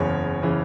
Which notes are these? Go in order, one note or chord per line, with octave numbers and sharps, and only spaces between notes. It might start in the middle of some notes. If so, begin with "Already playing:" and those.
Already playing: F#1 E2 C#3 E3 C#5 C#6
C#3 E3